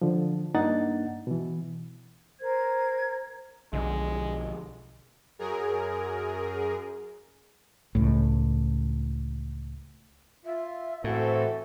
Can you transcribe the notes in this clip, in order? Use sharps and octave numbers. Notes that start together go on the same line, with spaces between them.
D3 F3
G2 A#3 D4 D#4 F#5 A6
B2 E3
A#4 C5 G#6
B1 B2 D3 F3 G#3
F#2 G#4 A#4
C#2 A2
F4 E5
A2 E3 C4 F#4 A4